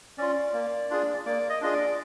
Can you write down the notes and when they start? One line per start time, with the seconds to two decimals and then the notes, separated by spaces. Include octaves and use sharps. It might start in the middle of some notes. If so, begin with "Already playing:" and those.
0.18 C#4 F4 D5
0.54 A#3
0.90 D4 F4 G#4
1.26 A#3 D5
1.49 D#5
1.61 D4 F4 G#4 D#5
1.73 D5